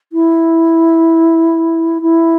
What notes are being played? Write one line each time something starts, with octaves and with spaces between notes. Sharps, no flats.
E4
E4